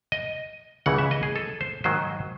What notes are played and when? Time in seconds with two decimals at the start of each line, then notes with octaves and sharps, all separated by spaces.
0.12 D#5
0.86 C#2 C#3 E3 F#5
0.98 E5
1.11 D#5
1.23 G#4
1.36 A4
1.61 C5
1.84 G#2 D#3 F#3 C5